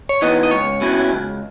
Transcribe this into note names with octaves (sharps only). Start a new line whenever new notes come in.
C#5
E3 B3 D#4 D#5
D#5
C#2 C#5
B2 F#3 C#4 E4
C#2